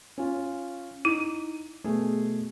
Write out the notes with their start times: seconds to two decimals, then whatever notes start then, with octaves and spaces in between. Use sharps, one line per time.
0.18 C#4 F4
1.05 D#4 E4
1.84 B2 A3 G#4